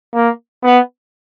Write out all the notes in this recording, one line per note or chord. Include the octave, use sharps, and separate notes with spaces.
A#3
B3